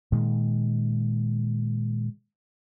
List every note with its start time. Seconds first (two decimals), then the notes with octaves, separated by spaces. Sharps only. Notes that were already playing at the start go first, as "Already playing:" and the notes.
0.12 A#2 D#3 G#3